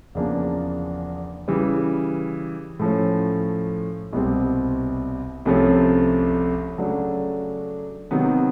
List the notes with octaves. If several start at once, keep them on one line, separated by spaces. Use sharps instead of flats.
E2 C#3 F3 A#3 D4
C#3 E3 G3
A2 F3 A3 C#4
C2 B2 G3 C4
C2 C3 F3 A3 C#4
C#3 F#3 A3 D4
C3 D#3 F#3 B3